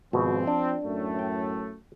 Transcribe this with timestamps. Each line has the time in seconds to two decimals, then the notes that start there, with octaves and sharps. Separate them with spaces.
0.13 G#1 B2 F3 C4
0.47 D4
0.83 F#2 A2 A3
1.19 G5